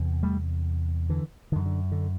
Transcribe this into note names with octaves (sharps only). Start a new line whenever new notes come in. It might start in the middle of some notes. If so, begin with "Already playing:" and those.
Already playing: E2 C3
G3 A3
D3 E3
F#2 D3 D#3
D3
D3